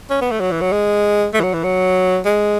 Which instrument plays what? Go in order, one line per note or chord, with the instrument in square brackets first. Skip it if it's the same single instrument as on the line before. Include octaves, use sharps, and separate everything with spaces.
[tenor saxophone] C#4
B3
A3
F#3
E3
F#3
G#3
A3
E3
F#3
E3
F#3
G#3